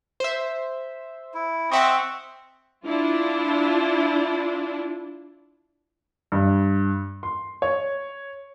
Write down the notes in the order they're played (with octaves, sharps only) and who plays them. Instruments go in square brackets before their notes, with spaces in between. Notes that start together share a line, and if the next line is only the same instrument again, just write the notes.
[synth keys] C5 E5
[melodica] E4
[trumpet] C4 [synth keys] D#5 E5 F#5 [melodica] C#6
[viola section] D4 E4 F4
[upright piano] G2
C6
C#5